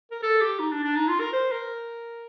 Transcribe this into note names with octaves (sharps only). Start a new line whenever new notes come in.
A#4
A4
G4
D#4
D4
D4
D#4
F4
A#4
C5
A#4